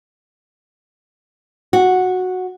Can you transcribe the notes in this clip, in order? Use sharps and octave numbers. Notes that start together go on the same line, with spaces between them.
F#4